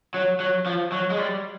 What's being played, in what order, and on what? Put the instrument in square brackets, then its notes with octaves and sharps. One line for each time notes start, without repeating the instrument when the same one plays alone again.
[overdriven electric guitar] F#3
F#3
F3
F#3
G#3
G3